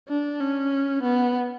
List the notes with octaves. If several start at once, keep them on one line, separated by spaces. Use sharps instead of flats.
D4
C#4
B3